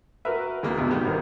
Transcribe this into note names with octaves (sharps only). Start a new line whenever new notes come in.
F#4 A#4 B4 E5
D2 E3 G#3 A#3
E2 G2 B2
D#3 G3 B3
G#1 A#4